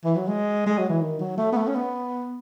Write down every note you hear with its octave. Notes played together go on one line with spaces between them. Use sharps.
E3
F#3
G#3
G#3
F#3
E3
D#3
F#3
A3
B3
A3
C#4
B3